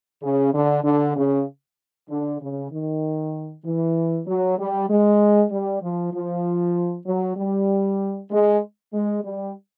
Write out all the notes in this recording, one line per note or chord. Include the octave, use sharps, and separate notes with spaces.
C#3
D3
D3
C#3
D3
C#3
D#3
E3
F#3
G3
G#3
G3
F3
F3
F#3
G3
G#3
G#3
G3